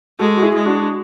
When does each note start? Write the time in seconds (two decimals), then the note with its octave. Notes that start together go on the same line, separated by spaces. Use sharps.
0.19 G#3 F#4 A4
0.37 F#4
0.42 E4 G#4
0.55 G#3
0.66 D4 F#4